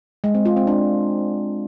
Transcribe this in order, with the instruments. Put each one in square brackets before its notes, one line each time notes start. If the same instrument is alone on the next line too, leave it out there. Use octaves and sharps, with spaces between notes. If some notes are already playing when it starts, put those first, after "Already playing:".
[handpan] G#3
C4
F4
C4
D4